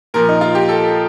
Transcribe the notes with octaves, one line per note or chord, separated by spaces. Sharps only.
A#2 F3 A#4
D#4
F4
G4
A4